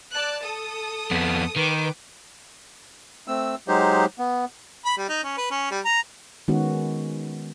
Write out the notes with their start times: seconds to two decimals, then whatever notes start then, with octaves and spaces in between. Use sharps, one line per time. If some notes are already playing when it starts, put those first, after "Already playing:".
0.11 D5 A5 F#6
0.42 A4 D#6
1.11 F2 B3
1.56 D#3 B4 G5 D6
3.28 A3 C4 E6
3.68 F#3 G#3 D#4 G4 C5
4.19 B3
4.85 B5
4.97 G3
5.09 D#4
5.24 C#4
5.37 B4
5.51 C#4
5.71 G3
5.85 A#5
6.48 D#3 G#3 B3 C#4 F#4